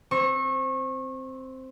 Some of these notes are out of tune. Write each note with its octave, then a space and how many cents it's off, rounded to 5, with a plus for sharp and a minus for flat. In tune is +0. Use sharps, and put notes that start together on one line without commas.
C4 +0 C#6 -30